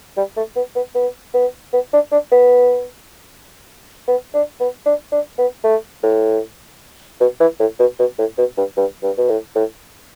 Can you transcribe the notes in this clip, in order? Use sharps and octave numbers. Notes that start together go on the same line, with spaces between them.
G3
A3
B3
B3
B3
B3
B3
D4
D4
B3
B3
D4
B3
D4
D4
B3
A3
A2
B2
E3
A2
B2
B2
A2
B2
G2
G2
G2
B2
A2
A2